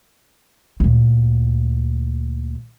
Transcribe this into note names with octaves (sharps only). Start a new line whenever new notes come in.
D2 A#2